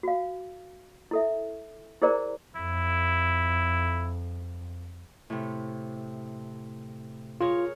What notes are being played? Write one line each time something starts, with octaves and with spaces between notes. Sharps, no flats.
F#4 F5
E4 A4 E5
E4 G#4 A#4 C5 D5 A#5
F2 E4
A2 C3
F4 G#4 A#4 C#5